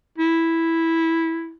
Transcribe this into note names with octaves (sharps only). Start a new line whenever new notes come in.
E4